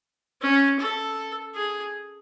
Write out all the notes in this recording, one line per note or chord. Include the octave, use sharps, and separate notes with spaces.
C#4
A4
G#4